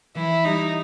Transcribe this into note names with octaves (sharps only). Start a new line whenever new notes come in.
E3 E4
G3 D#4